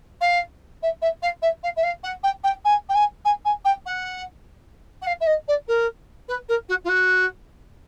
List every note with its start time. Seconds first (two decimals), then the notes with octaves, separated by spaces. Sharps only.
0.21 F5
0.82 E5
1.01 E5
1.22 F5
1.42 E5
1.63 F5
1.76 E5
1.83 F5
2.03 F#5
2.23 G5
2.43 G5
2.64 G#5
2.89 G5
2.94 G#5
3.25 G#5
3.45 G#5
3.64 G5
3.86 F#5
5.02 F#5
5.06 F5
5.20 E5
5.26 D#5
5.48 D5
5.68 A#4
6.28 B4
6.48 A#4
6.68 F#4
6.84 F4
6.89 F#4